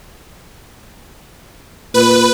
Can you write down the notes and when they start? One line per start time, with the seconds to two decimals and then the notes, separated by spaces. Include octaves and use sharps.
1.94 A#2 B4